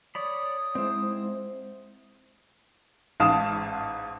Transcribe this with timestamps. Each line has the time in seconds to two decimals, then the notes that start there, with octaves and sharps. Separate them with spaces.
0.15 C#5 D5 B5 D#6
0.75 G#3 C4 E4 C5
3.20 A1 G#2 F5 A5 D#6 E7